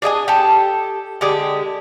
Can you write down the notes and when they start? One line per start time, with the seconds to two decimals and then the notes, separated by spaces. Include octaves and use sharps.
0.02 D4 G#4 D#5 G#5
0.28 G4 A4
1.21 D3 G#3 G4 G#4